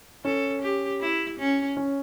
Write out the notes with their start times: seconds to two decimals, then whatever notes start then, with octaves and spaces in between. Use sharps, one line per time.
0.24 C#4 A4
0.62 G4
1.01 E4
1.39 C#4
1.77 C#4